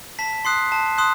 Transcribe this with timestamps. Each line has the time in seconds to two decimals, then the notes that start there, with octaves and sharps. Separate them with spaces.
0.19 A5 B6
0.45 C6 D#6 F#6 C7
0.72 A5
0.98 C6 D#6 F#6